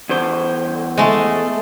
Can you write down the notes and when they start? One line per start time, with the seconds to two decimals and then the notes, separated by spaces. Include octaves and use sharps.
0.09 E2 C5
0.98 G#3 A3